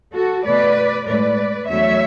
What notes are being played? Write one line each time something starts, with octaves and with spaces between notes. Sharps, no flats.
F#4 A4
B2 A3 B4 D5
A2 G#3 B4 D5
E2 D3 F#3 A3 C#5 E5